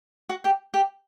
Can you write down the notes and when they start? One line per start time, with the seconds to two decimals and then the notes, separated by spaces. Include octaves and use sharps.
0.29 F#4 F#5
0.44 G4 G5
0.74 G4 G5